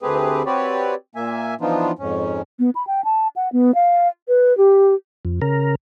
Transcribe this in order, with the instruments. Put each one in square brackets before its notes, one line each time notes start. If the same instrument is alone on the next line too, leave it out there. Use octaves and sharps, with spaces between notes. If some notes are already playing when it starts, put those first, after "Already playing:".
[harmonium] D2 A3 C4 G4 G#4 B4
C4 F#4 G4 B4 C#5 D5
A#2 A#3 E5 G#5
E3 F3 B3 D4 D#4 F4
F2 G#2 C#4
[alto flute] B3
B5
G5
A5
F#5
B3
F5
B4
G4
[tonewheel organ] F2
C#3 A#4